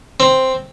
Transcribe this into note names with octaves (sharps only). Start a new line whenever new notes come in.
C4